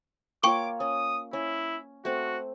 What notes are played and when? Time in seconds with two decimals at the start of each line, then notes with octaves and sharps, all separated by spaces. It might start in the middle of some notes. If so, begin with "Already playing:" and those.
0.43 A#3 F4 C#5 G5 C#6 D6 G7
0.80 C#4 D#6
1.33 C#4 E4
2.05 A3 C4 F#4